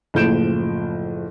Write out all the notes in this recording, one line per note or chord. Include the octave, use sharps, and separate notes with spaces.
F#1 A2 F3 G6 D7 E7